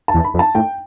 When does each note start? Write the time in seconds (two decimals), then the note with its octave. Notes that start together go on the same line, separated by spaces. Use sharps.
0.08 A5
0.14 E2
0.24 B5
0.34 F2
0.39 A5
0.54 A2 G5